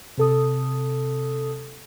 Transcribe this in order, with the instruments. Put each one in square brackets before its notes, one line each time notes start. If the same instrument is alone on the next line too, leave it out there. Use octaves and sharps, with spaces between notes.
[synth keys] C3 A4 D#6